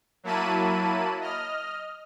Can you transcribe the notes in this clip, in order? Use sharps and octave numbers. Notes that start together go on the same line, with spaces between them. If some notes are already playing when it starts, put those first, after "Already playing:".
F#3 A#3 E4 A5 B5 D#7
D#5 F6